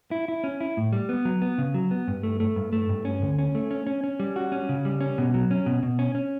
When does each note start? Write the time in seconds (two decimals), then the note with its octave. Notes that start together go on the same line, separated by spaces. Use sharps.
0.11 E4
0.28 E4
0.44 C#4
0.61 E4
0.77 A2
0.93 G3
1.09 B3
1.25 F#3
1.42 B3
1.58 C#3
1.74 F#3
1.91 B3
2.08 G2
2.23 A3
2.40 A3
2.56 G2
2.73 A3
2.89 G2
3.05 C#4
3.22 D2
3.39 C#4
3.55 A3
3.71 C#4
3.87 C#4
4.04 C#4
4.20 G3
4.36 F#4
4.52 C#4
4.69 C#3
4.85 G3
5.01 C#4
5.18 B2
5.34 F#3
5.51 C#4
5.66 B2
5.83 B2
5.99 C#4
6.15 C#4